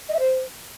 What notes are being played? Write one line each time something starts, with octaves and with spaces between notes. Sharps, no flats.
D#5
E5
C5